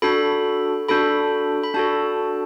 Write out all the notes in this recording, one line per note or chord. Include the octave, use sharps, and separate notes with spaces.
D4 F#4 A4 B5
D4 F#4 A4 B5
B5
D4 F#4 A4 A5